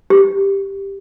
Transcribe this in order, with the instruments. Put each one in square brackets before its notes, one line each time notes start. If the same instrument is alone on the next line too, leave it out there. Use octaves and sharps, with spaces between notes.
[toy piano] G4